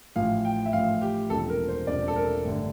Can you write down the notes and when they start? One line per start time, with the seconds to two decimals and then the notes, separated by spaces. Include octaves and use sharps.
0.16 A1 A2 F3 F5
0.45 G5
0.65 E5
0.73 A1 A2 F3 F5
1.01 G4
1.30 E1 E2 C3 F3 A4
1.50 A#4
1.68 C5
1.87 E1 E2 C3 F3 D5
2.08 A4
2.16 A#4
2.45 A1 G2 D3